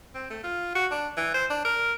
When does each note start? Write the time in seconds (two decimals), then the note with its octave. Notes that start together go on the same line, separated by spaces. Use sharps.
0.14 C4
0.30 A3
0.43 F4
0.75 F#4
0.91 D4
1.17 E3
1.34 C5
1.50 D4
1.65 A#4